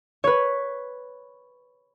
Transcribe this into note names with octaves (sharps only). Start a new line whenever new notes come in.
B4 C#5